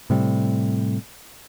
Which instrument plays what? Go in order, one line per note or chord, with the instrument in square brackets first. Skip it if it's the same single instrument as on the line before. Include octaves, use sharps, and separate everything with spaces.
[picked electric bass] A2 C3 G3